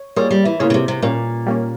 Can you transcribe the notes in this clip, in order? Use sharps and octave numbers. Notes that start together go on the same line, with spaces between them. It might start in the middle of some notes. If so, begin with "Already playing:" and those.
Already playing: C#5
G3 A#3 F4 G#4 C#5
G3
E3
C#3 A#3 F4 G#4 C#5
C#3
C3
C3
A#2 G3 A#3 C#4
G3 A#3 C#4